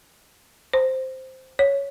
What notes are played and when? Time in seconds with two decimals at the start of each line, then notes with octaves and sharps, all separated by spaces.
0.74 C5
1.59 C#5